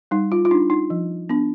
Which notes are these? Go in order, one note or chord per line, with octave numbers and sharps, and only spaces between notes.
G3 D#4
F4
F4
D4 D#4
D#4
F3
B3 D4